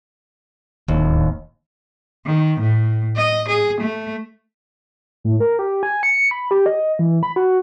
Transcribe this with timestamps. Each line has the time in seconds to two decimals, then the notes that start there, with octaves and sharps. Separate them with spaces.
0.88 D1 D#2
2.26 D#3
2.60 A2
3.17 D#5
3.49 G#4
3.81 A3
5.24 A2
5.40 A#4
5.59 G4
5.83 G#5
6.03 C#7
6.31 B5
6.51 G4
6.66 D#5
6.99 E3
7.23 B5
7.36 F#4